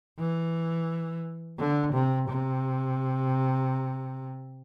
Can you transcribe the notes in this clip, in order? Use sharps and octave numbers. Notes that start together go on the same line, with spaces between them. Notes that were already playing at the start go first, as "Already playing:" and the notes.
E3
D3
C3
C3